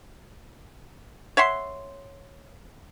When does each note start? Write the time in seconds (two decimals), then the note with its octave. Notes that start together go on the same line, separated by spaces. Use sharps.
1.37 C#5 E5 F#5 C6